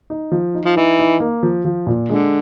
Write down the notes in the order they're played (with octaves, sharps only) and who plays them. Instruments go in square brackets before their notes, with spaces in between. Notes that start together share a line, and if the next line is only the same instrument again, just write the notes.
[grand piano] D#4
F3
D#4
[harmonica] F3
[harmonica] E3 [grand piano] D#4
[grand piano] D#4
A#3
F3
F3
A#2
[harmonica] D3 [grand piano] G#3